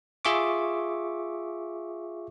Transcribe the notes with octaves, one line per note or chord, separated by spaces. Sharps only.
F4 G#4 E5 C#6 D6